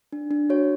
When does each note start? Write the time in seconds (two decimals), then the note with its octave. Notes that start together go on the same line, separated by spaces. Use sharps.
0.12 D4
0.31 D4
0.50 F#4 C#5